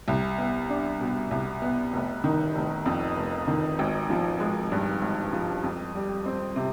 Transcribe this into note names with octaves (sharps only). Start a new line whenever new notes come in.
C2
B3
D4
B2
C2
B3
F1
D#3
F1
F2
F1
D#3
G#1
F3
G#3
G2
G#1
F3
F2
G3
C4
C3